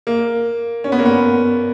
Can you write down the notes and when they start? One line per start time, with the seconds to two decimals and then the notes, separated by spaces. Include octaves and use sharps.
0.07 A#3
0.84 C#4
0.92 B3
0.99 A#3
1.06 B3